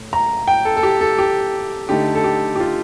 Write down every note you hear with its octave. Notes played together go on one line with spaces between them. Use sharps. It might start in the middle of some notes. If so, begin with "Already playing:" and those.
Already playing: A2
A#5
G5
A4
A4
G4
A4
G4
D3 A3 D#4 G4
A4
G4
G4
F4